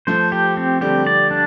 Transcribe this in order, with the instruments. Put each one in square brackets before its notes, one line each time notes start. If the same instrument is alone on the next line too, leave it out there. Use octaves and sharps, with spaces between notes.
[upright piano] F3 A3 [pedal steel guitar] C5
[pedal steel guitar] G4
C4
[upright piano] D3 G3 [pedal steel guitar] G4
[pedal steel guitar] D5
D4